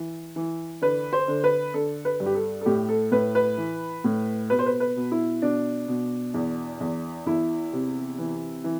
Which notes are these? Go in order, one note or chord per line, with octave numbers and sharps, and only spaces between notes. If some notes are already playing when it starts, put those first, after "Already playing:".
Already playing: E3
E3
D3 B4
C5
D3
B4
D3 A4
B4
G2
G4
A4
A4
A2 G4
A4
A2 B4
B4
E3
A2
B2 B4
C5
B4
B4
B2
E4
B2 D4
B2
E2
E2
E2 E4
C3
E3
E3